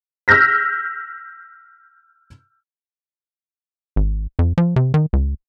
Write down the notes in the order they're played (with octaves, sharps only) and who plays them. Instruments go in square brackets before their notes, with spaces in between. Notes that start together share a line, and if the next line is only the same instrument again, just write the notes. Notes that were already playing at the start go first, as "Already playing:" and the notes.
[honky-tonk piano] E6 F6 G6 A#6 B6
[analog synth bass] G#1
F2
F3
C3
D#3
C#2